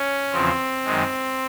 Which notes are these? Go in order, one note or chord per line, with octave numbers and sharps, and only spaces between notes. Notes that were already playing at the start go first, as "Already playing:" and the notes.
Already playing: C#4
E2 C#3 F3 C4
F#2 D#3 G#3